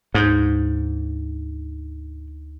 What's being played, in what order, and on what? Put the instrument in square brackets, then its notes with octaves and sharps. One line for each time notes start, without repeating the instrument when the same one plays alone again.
[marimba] D2 D#4 G6 [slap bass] G#2